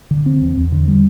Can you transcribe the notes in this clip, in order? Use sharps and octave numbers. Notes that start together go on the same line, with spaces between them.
D3
C4
E2
E2
D3
G3